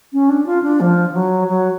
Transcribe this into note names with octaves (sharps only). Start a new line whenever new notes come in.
C#4
D4
F4
D4
F3
F3
F#3
F#3